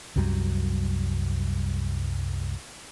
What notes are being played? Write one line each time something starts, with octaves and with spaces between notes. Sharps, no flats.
C2 F#2 F#3 G3